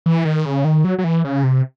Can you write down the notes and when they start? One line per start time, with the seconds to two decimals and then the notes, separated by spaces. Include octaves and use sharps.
0.06 E3
0.25 D#3
0.45 C#3
0.65 D#3
0.84 F#3
0.98 F#3
1.04 E3
1.24 C#3
1.44 C3